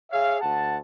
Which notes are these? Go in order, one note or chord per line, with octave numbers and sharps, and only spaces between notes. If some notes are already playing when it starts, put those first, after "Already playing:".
G#4 C#5 E5 F5
D2 F#5 A5